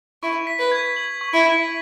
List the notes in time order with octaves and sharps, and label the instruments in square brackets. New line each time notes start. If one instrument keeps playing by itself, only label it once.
[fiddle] E4 [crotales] C#6
[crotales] B6
[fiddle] B4
[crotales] G#6
F#7
C#6
[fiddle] E4
[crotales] B6